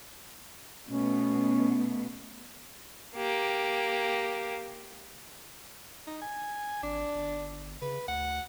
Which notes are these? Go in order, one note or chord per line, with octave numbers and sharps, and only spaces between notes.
B2 A3 B3 C#4
A#3 G4
D#4
G#5
G#1 D4
G1
C#3 B4
D2 F#5